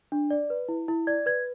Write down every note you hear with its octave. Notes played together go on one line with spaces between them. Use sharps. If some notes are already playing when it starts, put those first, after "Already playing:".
D4
D5
B4
E4
E4
D5 G#6
B4 G#6